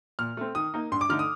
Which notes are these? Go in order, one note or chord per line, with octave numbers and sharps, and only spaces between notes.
A#2 F6
A3 C4
D#3 D#6
A#3 D#4
G2 C6
D6
D3 A3 D#4 F6
D#6